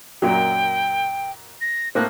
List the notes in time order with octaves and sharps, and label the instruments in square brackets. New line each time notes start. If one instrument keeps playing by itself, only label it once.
[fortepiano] F#2 A#2 F#3 [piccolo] G5
[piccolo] A#6
[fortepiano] A2 A#3 C4 [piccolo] F#6